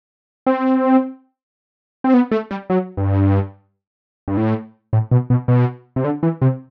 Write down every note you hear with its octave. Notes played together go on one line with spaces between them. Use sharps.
C4
C4
B3
A3
G3
F#3
G2
G2
A2
A2
B2
B2
B2
C3
D3
E3
C3